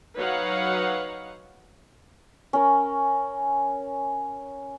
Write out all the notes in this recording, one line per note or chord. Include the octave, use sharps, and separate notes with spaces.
F#3 D#4 B4 C#5 F5 F#5
C#4 A#4